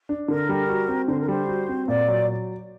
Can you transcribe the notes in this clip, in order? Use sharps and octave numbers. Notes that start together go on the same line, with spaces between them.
D4
D3 A#4
G3
F#4
C4
D3 C5
A#4
G3 C5
F#4
C4
A#2 D5
F#3